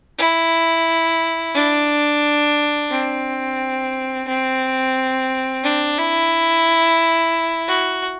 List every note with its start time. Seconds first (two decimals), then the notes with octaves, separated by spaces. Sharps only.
0.18 E4
1.55 D4
2.91 C4
4.28 C4
5.64 D4
5.98 E4
7.68 F#4